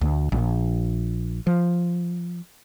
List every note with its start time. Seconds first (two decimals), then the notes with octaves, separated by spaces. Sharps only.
0.01 D2
0.32 A#1
1.47 F3